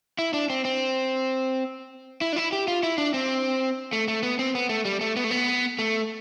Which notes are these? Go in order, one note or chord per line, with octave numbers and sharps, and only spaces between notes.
E4
D4
C4
C4
E4
D4
E4
G4
F4
E4
D4
C4
A3
A3
B3
C4
B3
A3
G3
A3
B3
A3
B3
A3